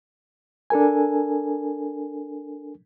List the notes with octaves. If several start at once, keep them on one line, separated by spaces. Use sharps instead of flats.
D4 A4 A#4 G#5